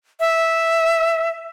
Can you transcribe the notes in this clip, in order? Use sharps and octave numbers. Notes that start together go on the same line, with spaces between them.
E5